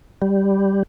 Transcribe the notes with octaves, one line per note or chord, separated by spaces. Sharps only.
G3